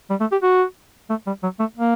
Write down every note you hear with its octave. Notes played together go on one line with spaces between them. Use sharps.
G3
A3
G4
F#4
A3
G3
F#3
A3
A#3